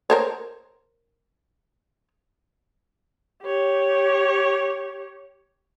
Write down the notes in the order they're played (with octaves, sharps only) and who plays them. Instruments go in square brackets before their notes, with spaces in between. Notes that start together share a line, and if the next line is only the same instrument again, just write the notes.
[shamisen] A#4 C5 C#5
[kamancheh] G4 C#5